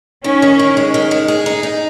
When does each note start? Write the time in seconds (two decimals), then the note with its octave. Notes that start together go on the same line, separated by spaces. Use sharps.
0.24 D#3 C#4
0.42 D#3
0.59 D#3
0.77 G#3
0.94 D#3
1.11 G#3
1.28 G#4
1.46 D#4
1.63 D#4